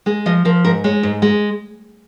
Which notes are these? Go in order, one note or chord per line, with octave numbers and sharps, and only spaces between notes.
G#3 G#4
F3 D#5
F3 A#4
G#2 A#4
G#3 C#5
G#2
G#3